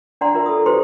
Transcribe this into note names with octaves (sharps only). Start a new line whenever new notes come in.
D4 D5 F#5 A#5 C6
F4 A#4 E5
A4 D#6
F#4 G4 A4 B4 C5 C6